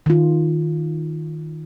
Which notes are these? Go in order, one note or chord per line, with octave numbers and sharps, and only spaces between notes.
D#3 F4